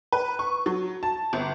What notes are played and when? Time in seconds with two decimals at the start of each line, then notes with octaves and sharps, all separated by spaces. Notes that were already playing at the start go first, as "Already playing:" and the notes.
0.12 B4
0.39 C#6
0.66 F#3
1.03 A5
1.33 G1